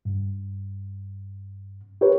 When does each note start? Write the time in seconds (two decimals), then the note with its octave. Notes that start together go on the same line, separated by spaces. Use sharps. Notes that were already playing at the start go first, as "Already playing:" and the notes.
0.05 G2
2.01 G4 A#4 B4 C#5